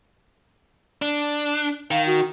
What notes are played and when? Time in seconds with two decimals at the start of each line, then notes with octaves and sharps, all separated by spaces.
1.02 D4
1.91 D#3 F5
2.06 F#4